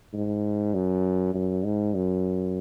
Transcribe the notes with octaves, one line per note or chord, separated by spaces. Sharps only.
G#2
F#2
F#2
G#2
F#2